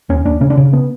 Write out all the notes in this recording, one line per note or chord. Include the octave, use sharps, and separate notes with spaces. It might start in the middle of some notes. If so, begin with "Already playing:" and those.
D#2 C#4
D#2 D4
C#3 C#4
D4
C#3 C#4
B3